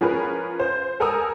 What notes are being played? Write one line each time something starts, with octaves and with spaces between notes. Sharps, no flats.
F3 C#4 G#4 A#4 B4
C5
A4 A#4 G#5 A#5 D#6 E6